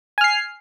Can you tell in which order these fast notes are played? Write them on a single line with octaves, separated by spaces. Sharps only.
G#5 F6 C7